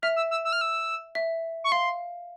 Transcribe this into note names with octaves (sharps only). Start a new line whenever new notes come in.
E5 F6
E6
E6
E6
F6
E6
E5
C#6
F5 C6